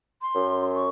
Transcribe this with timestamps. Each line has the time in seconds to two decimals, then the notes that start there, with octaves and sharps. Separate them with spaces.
0.22 C6
0.35 F#2
0.75 C#6